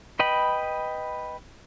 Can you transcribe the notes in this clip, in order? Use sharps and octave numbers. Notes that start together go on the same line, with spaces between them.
B4 D#5 G5 B5